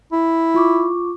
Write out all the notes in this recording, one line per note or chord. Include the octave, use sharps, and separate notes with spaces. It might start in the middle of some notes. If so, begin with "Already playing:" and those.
E4
F4 C#6 D6